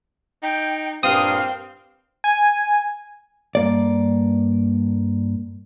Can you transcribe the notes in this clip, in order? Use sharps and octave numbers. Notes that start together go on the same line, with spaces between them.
D#4 G5
G2 A#2 C4 F5 D#6
G#5
G2 A#3 D5